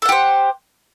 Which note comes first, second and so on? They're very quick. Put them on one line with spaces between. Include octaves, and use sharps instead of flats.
A4 F#5 G4 C5